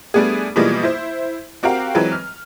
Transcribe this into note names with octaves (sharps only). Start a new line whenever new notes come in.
G3 A3 B3 D4 G#4
B2 E3 F3 G3 G#3 A#3
E4 C5
C4 F#4 G4 A#4 F5
E3 F#3 G#3 C4 B4
F6